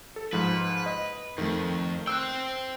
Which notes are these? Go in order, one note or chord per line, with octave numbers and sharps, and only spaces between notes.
A4
G#2 F3 B4
D#5
F2 D#3 A3
C5 G5 E6 F#6